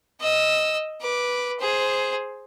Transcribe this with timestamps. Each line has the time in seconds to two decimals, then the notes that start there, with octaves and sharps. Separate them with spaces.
0.20 D#5 E6
1.01 B4 D6
1.59 G#4 C5